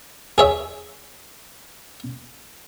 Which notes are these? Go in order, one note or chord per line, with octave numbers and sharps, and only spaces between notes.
G#4 C#5 E5